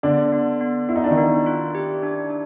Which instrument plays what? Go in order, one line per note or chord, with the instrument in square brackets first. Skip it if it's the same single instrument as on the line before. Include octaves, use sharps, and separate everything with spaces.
[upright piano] D3 D4 [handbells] B3
[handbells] B3
B3
[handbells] B3 [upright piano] E4
[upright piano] D#4
D4
D#3 D#4
[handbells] B3
F4
G4
D4
D4